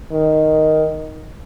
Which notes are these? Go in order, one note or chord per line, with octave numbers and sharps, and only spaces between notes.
D#3